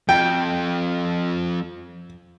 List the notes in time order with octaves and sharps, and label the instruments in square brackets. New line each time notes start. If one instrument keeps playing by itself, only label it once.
[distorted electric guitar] F2 [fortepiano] G5